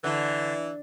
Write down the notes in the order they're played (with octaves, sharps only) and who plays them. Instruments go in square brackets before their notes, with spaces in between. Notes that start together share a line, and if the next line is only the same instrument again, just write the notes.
[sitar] D3 [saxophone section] E3